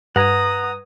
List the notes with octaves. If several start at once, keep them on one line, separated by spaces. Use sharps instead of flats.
G2 B4 F#5 A#5 D#6 G#6 D#7